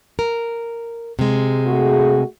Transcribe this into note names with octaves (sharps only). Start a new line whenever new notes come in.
A#4
C3 G#3
A3 F#4 G#4